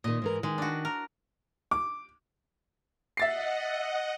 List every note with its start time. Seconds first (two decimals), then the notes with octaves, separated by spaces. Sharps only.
0.04 A#2 D#3 D#5
0.22 G#2 E3 A#4
0.43 D#3 G#3
0.58 D4 F#4
0.85 A#4
1.71 D6
3.17 D#5 E5 F#5 A6 C7